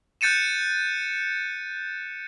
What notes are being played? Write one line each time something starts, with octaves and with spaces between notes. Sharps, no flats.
F#6 G6 A6 C#7 D#7 E7